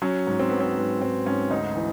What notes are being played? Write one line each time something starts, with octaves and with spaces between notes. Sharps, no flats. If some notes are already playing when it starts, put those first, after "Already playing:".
F#3 C#4
G#2
C4
F#3 B3
C4
G#2 B3
G#2 C4
G#2 C#4
D2 D#4
E3